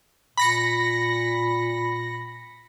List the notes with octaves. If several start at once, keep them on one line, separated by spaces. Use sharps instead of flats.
A#2 B5 A#6 C#7